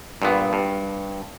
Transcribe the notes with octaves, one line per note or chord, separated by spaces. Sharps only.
G2 A#2 B3
G2